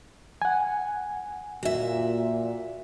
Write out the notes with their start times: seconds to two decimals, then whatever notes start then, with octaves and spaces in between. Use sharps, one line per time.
0.42 F#5 G#5
1.63 A#2 F#4 E5